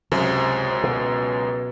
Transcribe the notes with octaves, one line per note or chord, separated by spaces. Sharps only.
C#2 F#2 C3
B2